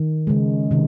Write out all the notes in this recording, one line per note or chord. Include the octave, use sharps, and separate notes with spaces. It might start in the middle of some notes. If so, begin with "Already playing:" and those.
Already playing: D#3
C#3 G#3
C3 D#3